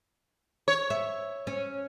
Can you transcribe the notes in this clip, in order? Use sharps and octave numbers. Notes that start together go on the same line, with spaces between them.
C#5
E5
C#4